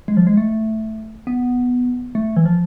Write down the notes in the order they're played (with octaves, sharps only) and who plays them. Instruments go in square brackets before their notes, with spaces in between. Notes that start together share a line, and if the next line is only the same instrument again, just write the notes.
[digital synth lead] G#3
F3
G#3
A3
B3
A3
E3
F3